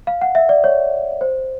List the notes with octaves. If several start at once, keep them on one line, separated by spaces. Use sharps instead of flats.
F5
F#5
E5
D5
C#5
C5